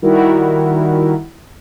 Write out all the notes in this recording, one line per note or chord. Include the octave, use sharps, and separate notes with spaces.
D#3 G3 E4 F#4 A#4